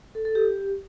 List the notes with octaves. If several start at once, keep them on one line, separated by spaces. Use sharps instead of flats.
A4
A4
G4